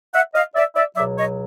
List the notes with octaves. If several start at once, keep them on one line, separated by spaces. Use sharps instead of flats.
E5 F#5
D#5 F5
D5 E5
D5 E5
C#2 B2 F#3 D5 E5
C#5 D#5